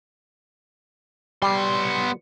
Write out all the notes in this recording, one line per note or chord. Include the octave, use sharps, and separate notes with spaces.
G3 B3 C6